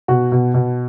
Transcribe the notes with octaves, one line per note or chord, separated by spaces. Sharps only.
B2 F#4
B2
B2